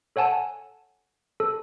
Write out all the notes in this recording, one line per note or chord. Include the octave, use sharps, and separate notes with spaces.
A4 C#5 F#5 G#5 A5
A4